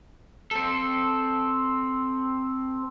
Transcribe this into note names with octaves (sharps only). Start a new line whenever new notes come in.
C4 A4